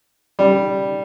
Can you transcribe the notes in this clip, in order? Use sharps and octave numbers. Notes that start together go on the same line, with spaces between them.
G3